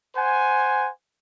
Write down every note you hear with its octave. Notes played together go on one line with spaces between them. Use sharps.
C5 F#5 G#5